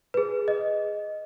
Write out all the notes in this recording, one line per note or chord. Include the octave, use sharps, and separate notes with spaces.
B4
G#4
D#5